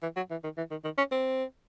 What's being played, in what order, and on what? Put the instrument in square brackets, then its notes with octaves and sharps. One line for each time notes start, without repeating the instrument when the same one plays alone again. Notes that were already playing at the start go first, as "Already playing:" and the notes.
[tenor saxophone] E3
F#3
E3
D#3
E3
D#3
D#3
C#4
C4